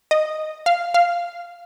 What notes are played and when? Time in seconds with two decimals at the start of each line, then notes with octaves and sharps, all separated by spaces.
0.11 D#5
0.66 F5
0.94 F5